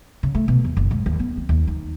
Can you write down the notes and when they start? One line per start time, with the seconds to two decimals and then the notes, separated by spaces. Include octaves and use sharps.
0.23 C#3
0.35 A3
0.48 B2
0.64 E2
0.77 F#1
0.91 G#2
1.06 D#2
1.20 B3
1.37 C4
1.49 D#2
1.67 D#4